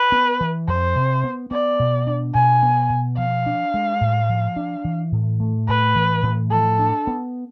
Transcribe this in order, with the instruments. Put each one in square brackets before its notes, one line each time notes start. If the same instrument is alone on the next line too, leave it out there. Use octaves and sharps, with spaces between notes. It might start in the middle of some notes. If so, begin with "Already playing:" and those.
Already playing: [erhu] B4
[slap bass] B3
E3
[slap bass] F2 [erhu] C5
[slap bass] C3
B3
[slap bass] B3 [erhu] D5
[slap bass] B2
D4
[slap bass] B2 [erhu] G#5
[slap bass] B3
B2
[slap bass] F3 [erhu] F5
[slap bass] D4
G#3
A2
F3
D4
E3
A2
A3
[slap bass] A2 [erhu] B4
[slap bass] E3
A2
[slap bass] F3 [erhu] A4
[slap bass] D4
B3